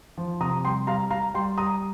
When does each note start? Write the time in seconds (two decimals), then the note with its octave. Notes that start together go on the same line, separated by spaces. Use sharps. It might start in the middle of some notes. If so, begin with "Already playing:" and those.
0.18 F3
0.41 C3 A#5 D#6
0.64 G3 G5 C6
0.87 G3 F5 A#5
1.11 G3 F5 A#5
1.34 G3 G5 C6
1.58 G3 A#5 D#6